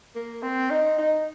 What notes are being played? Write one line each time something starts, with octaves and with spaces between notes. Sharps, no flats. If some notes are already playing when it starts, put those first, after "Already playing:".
A#3
C4
D#4
D#4